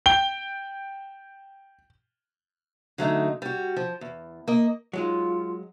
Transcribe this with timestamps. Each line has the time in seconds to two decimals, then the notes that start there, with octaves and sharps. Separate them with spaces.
0.06 G5 G7
2.98 D3 F#3 A3 D#4
3.42 G3 F#4
3.77 F3
4.01 E2
4.47 A#3 D#5
4.93 F#3 G#3 D#4 F4